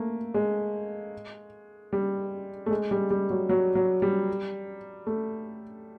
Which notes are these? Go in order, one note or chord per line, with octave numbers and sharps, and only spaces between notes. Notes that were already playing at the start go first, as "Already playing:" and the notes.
Already playing: A3 A#3
G#3
G3
A3
G#3
G3
G3
F#3
F#3
F#3
G3
A3